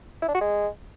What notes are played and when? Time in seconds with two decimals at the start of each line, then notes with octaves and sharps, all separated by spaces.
0.22 E4
0.28 D4
0.35 F#4
0.41 G#3